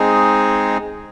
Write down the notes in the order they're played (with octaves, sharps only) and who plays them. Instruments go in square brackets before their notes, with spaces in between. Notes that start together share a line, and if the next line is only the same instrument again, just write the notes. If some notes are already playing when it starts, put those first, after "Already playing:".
Already playing: [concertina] G#3 C4 D#4 G#4